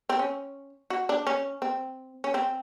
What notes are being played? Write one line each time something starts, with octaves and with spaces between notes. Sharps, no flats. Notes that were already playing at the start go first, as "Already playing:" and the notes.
C4
C#4
F#4
D4
C#4
C4
C#4
C4